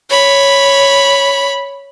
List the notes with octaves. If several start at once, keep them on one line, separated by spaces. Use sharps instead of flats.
C#5 B5